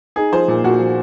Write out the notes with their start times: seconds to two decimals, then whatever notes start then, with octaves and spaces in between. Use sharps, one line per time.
0.16 D#4 G#4
0.32 F3 C5
0.48 A#2
0.64 A#2 F#4
0.80 F3